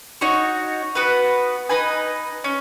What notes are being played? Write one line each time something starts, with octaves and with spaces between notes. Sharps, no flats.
D#4 F#4 C#5
B3 F#4 B4
D#4 B4 G#5
C#4